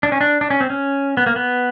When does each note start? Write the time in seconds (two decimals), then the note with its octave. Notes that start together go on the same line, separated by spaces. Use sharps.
0.03 D4
0.12 C#4
0.21 D4
0.41 D4
0.50 C#4
0.61 C4
0.70 C#4
1.17 B3
1.26 A#3
1.36 B3